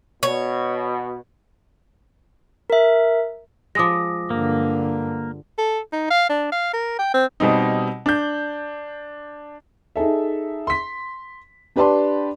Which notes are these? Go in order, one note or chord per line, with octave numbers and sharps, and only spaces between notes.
B2 C#5
A#4 E5
F3 G#3 D6 D#6 A#6
G2 D3 A#3
A4
D#4
F5
D4
F5
A#4
G5
C4
B2 G3 C4 D#4
D4 G6
D#4 G#4 A4 E5
C6 B6
D4 G4 B4 D5 A5 C6